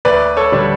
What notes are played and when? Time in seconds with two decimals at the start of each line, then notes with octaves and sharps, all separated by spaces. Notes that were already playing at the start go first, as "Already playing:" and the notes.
0.05 D2 B4 D5
0.37 A4 C#5
0.52 D3 G3 D4